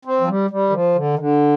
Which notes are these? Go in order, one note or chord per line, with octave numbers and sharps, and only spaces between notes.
C4
F3
G3
G3
D#3
F3
D3
D#3
D3